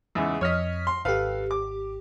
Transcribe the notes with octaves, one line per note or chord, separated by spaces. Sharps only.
E2 G#2 C#3 E6
F2 C#5 D#5 F6 B6
C6
G#1 G4 A4 B4 F5
D6